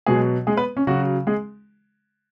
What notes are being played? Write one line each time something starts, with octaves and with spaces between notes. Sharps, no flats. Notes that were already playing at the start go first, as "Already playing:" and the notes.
B2 F#3 G#3 G#4
G#3 G#4
B3 B4
C#4
C#3 F#3 F#4
G#3 G#4